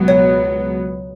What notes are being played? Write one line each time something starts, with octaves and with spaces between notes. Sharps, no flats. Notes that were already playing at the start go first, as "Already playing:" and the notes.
Already playing: C#2 B2 F#3 B3
C#5